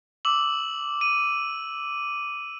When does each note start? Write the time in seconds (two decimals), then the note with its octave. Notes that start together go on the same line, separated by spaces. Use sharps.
0.25 D6 E6 F#7
1.01 D#7